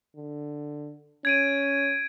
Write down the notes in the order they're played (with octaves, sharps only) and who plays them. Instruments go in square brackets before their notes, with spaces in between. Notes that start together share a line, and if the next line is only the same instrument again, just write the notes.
[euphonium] D3
[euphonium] C#4 [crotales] G#6 D7 D#7